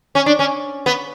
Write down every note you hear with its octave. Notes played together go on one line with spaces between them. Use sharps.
C#4
D4
C#4
B3